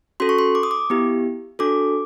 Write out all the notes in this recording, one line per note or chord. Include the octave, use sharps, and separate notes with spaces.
C#4 F#4 A4 C6
C#6
C6
D6
D#6
D6
B3 E4 G4
D4 F#4 A4 D6